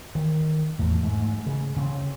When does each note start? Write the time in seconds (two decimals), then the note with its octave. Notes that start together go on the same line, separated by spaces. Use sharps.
0.15 D#3
0.79 E2 A2
1.03 G#2 A3
1.46 C#3
1.76 C#3 C4